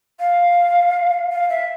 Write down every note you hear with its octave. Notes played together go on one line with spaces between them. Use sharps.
F5
F5
E5